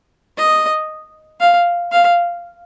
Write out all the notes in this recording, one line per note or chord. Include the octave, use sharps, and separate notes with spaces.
D#5
F5
F5